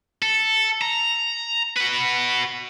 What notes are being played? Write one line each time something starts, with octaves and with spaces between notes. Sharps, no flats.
A4
A#5
F#4 B4